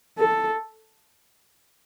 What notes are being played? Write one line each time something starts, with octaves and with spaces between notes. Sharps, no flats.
A4